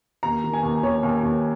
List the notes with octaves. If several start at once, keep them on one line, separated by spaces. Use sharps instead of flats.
D#2 A#5
D#3
G#5
D#2
D#2 C#5
D#2
D#2